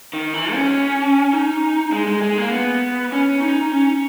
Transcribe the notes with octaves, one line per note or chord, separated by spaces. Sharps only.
D#3
E3
C#4
D#4
G#3
G#3
G#3
A#3
B3
C#4
D#4
C#4